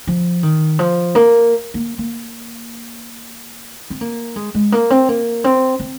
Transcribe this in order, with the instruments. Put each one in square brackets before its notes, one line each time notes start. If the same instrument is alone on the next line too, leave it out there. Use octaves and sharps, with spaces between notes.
[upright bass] F3
D#3
F3
A#3
A#3
A#3
C4
A#3
G#3
G#3
A#3
C4
A#3
C4
C4